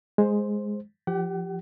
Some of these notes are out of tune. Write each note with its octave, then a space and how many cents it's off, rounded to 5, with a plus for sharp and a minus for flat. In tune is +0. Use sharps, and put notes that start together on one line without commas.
G#3 +0 C5 +5
F3 -10 G4 +0 F#5 +40